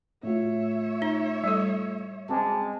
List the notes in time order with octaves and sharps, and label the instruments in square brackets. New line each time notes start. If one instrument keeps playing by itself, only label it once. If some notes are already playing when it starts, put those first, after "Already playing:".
[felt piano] A2 F4 [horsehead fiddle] C#5 E5
[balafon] D#4
G3 A4
[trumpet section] G#3 A5 [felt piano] C4 G5 D6